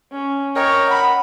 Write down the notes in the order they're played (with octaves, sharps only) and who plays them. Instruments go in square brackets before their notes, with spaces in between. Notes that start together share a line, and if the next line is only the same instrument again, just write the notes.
[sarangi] C#4
[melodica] A#4 D#5 G5 [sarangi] C#5
[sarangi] F#5 [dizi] B5